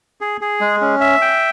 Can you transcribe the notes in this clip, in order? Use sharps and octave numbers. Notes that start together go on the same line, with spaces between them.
G#4
G#4
G#3
C#4
E5
G5